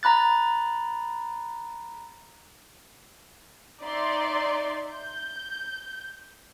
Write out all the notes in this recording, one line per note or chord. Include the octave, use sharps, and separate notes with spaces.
A#5 B5 F#6 A6
D#4 D5 E5 C6
G6